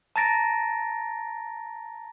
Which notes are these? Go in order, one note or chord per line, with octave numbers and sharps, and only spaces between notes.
A5 A#5 A6 A#6 D7